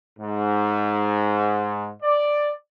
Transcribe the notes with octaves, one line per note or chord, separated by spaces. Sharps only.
G#2
D5